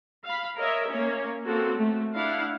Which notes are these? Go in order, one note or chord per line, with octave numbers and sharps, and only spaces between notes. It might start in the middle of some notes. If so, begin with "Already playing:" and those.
F5 B5
A#4 C#5 D#5 E5
A#3 C#4 C#5
A#3 C4 F#4 A4
A3
D4 E4 F5 F#5